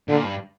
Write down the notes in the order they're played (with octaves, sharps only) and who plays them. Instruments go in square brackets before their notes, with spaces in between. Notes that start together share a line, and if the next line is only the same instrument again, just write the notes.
[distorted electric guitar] A#2 [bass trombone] D3
[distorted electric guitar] G2